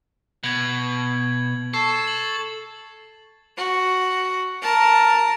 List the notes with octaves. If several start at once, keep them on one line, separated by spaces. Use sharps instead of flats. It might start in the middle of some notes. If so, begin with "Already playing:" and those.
B2 G#6 F#7
A4 C#6 C7
F#7
F#4
A#4 A5